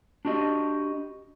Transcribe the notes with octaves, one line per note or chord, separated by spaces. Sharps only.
D4 F#4 G4 D#5